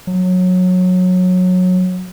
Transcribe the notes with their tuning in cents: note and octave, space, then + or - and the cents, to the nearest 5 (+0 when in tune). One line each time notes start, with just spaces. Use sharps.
F#3 -20